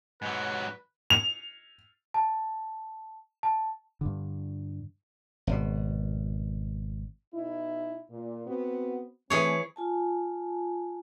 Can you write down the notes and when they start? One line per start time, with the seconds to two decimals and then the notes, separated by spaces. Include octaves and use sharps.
0.22 G#2 F#3 B4
1.10 F7
2.14 A5
3.43 A5
4.01 G2 D3
5.47 G#1 B2
7.34 B2 D#4 E4
8.10 A#2
8.47 B3 C4 F#4
9.30 E3 A3 C4 G#4 C#5
9.76 F4 G#5 A5